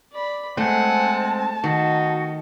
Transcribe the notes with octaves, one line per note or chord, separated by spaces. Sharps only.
D5 B5
G#3 A3 C4 F#5 G#5 A5
D#3 D#4 F#4